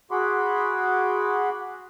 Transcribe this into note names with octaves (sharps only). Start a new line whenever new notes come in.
F#4 G#4 F#5 B5 C6 D6